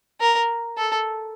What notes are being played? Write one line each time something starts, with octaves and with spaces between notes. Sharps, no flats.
A#4
A4